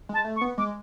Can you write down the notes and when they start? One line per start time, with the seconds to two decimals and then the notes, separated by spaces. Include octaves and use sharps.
0.09 G#3 A5
0.25 A3
0.36 C#6
0.41 B3
0.58 G#3 D6